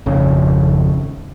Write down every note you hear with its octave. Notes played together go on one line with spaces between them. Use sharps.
G#1 F2 C#3